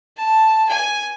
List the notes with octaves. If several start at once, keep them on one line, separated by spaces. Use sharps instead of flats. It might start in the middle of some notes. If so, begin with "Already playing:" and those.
A5
G#5